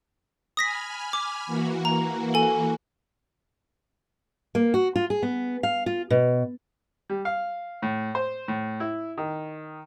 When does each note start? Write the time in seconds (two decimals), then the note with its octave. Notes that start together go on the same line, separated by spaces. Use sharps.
0.57 G#5 B5 D#6 F6 A#6 B6
1.13 D6
1.46 E3 A#3 F#4
1.85 A#5
2.34 A4 G#5
4.55 A#3
4.74 F#4
4.96 F4
5.10 G#4
5.23 B3
5.63 F5
5.86 F4
6.10 B2
7.10 G3
7.25 F5
7.82 A2
8.15 C5
8.48 A2
8.80 E4
9.18 D#3